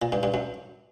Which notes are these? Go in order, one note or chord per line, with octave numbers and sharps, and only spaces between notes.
A#2
G2
G2
F#2